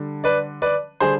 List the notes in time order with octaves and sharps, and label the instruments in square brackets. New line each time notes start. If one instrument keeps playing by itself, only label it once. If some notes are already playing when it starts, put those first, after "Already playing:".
Already playing: [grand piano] D3 G3
B4 D5
B4 D5
D3 G3 G#4 C5